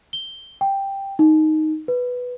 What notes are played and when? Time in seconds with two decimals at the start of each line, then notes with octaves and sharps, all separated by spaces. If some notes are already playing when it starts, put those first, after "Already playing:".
0.13 G7
0.61 G5
1.19 D#4
1.88 B4